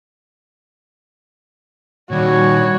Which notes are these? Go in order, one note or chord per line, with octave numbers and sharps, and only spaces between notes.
A#2 D#3 G3 F#4 C#5